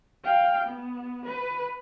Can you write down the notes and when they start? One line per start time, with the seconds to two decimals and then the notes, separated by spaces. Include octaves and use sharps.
0.25 F5 G5
0.65 B3
1.26 B4